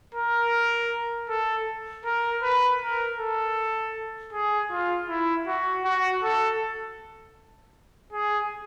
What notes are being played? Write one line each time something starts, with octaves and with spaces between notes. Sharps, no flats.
A#4
A4
A#4
B4
A#4
A4
G#4
F4
E4
F#4
F#4
A4
G#4